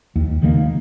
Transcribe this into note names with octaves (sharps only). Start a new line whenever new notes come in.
D#2
D#3 F#3 A#3